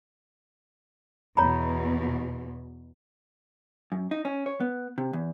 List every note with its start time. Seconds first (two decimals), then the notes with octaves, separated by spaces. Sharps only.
1.37 E2 B2 C#5 A#5 B5
3.92 F#2
4.11 D#4
4.25 C#4
4.46 C#5
4.60 B3
4.98 C3
5.13 E2